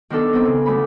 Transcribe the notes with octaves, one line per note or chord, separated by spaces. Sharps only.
D#3 B3 D4 A4
B3 C4
C#3
D2 A3 D4 B5